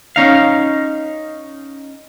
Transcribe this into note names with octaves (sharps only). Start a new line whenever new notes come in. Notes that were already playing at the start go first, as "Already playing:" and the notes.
C#4 D#4 F5